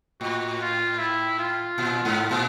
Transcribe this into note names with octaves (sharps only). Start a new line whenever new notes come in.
A2 F#4
F4
E4
F4
A#2
G#2
A#2